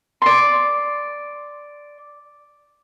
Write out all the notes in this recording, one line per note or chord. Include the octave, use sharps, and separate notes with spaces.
D5 C6